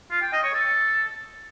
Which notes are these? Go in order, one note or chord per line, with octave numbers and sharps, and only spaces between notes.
F4
G5
D#5
C#5
A4